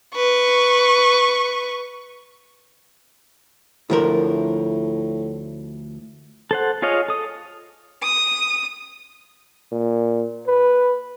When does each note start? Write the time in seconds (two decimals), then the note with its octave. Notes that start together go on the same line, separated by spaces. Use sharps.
0.16 B4 C#6
3.90 D2 A2 F3 A#4
6.51 A4 C5 F#5
6.82 F4 G#4 C#5 D#5 F5
7.08 A4 D#6
8.03 D#6
9.71 A#2
10.47 B4